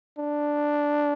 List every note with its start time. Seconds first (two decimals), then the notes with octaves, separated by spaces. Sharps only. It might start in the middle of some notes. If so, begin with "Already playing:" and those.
0.19 D4